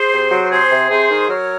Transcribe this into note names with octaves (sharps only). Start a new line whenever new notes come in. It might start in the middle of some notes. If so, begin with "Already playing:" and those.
Already playing: G#4 C5
C3
F#3
C3 G#4 C5
C3
C3 G#4 C5
D#3
F#3 A#4 C#5